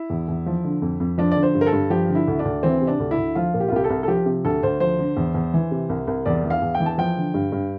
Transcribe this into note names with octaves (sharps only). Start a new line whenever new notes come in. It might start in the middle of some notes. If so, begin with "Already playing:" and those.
Already playing: E4
E2
E2
F3
D3
F2
F2
F3 D4
D3 D5
C5
G2
A#4
A4
G2
F3 G4
D3
E4
D2
D4
D2
E3 C4
C3
D4
D2
E4
D2
F3 F4
A#2
G4
F4
C2 G4
A4
C2
A4
F3 G4
C3
D2 A4
D2 C5
F3 C5
D3
E2
E2
E3
C3
C2
C2
E2 D5
E3
F5
E2
G5
E3
A5
F3 G5
D3
G2
G2